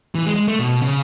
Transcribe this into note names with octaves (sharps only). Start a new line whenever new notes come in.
E3
G#3
G#3
A3
B2
C#3